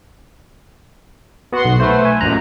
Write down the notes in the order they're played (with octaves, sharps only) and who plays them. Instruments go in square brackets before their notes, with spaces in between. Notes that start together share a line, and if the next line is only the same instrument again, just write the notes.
[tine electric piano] B3 F#4 [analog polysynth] F#5 C6
[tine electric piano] B1
[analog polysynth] A3 [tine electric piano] B4 C5
[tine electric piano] G#5
[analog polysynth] A1 F#2 A#2 [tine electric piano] A#5 F#6